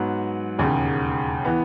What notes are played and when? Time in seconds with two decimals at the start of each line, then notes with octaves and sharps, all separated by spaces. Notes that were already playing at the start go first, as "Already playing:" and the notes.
Already playing: G#2 F#3 B3
0.59 E1 D#2 C#3
1.45 E3 B3